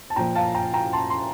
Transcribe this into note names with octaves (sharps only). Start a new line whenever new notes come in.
A5
A#2 F3 G5 A#5
F5 A5
G5 A#5
G5 A#5
A5 C6
C6